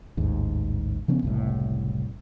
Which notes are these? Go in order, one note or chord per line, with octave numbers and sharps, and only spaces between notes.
A1 D#2 G#2
C#3 F3 B3 C#4
F#1 C2 A2